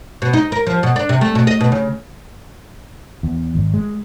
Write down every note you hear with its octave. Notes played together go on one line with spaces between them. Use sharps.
B2
D#4
A#4
F3
B2
D4
C3
A3
B2
D#5
B2
C#3
E2
G#1
G#3